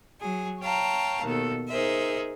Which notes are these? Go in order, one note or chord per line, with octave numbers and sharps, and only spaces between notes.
F#3 G#4
C#5 F5 G5 A5 A#5
D#2 B2 A4
D#4 G#4 A#4 C5 E5